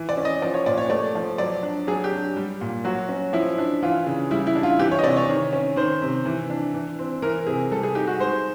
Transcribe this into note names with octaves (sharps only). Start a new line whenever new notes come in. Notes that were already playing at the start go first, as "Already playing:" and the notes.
Already playing: E3
D5
C#4
D#5
F3 D5
C#5
A#2 D5
C#5
A3 D5
F3
F#3 D5
D4
F#3 G#4
G4
D4
G3
A#2
F#3 F#4
C#4
F3 E4
D4
E3 F4
C#3
G3 E4
E4
D4
F4
E3 G4
C#5
D#5
C3 D5
C#5
D#3
C#4
D#3 C5
C3
E3
D4
E3
C4
E3 A#4
C3 G#4
G3 A4
G#4
D#4 G4
F#4
G#3 C5